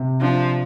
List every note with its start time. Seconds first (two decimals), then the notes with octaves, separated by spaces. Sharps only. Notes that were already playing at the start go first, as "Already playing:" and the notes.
Already playing: C3
0.21 F3 D4